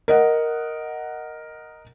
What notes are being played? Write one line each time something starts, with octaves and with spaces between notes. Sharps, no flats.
A#4 D#5 F#5